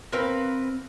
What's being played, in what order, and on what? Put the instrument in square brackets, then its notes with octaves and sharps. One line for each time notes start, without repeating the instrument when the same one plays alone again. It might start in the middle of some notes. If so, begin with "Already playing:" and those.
[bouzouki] C4 A#4 B4 F5